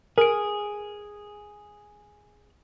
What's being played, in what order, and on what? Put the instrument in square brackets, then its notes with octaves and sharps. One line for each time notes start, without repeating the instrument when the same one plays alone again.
[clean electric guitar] G#4 [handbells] A#4 D7